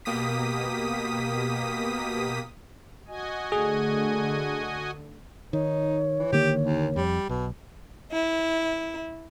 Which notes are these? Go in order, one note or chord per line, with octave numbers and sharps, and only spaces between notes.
B2 A#3 G4 D#6 B6
F#4 D#5 G#5
D3 A3 G#4
D#3 D#4 C#5
E3
D3 D#3 A#3 G4
D#2
F2 G3
B1 B2
E4